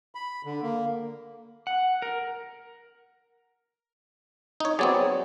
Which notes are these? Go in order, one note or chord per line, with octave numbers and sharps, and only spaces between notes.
B5
D3
A#3
F#5
A#4
D#4 C#5
F#3 B3 C4 G#4 C#5 D5